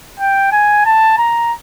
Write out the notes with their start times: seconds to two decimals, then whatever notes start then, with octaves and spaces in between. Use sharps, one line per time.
0.20 G5
0.52 G#5
0.85 A5
1.18 A#5